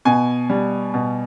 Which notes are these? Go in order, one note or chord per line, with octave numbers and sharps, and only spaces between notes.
B2 G#5
G3
B2